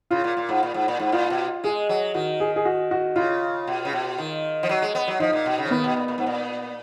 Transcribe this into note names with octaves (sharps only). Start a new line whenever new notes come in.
C#3 F4
A#2
A#2
G#2
A#2
G#2
A#2
G#2
A#2 F4
B2
G#3 G#4
F#3
D#3 F#4
G#4
G#4
F#4
F#4
C#3 F4
B2
C#3
B2
D#3
F3
F#3
G#3
B3
F#3
F3 D#4
A#2
B2
C#3
F3
D#3 B3
B2
A#2
A#2
G#2
A#2